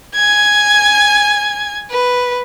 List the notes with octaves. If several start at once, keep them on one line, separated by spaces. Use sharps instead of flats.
G#5 G#6
B4